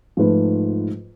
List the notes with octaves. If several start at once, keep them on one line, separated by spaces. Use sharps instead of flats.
G#2 F3 A3 F4 B4